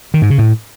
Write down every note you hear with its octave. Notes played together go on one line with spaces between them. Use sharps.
D#3
G#2
C#3
A2